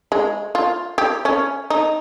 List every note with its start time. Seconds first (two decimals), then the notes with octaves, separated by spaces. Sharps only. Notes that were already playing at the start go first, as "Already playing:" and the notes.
0.12 G#3
0.55 F4
0.98 G4
1.25 C#4
1.70 D#4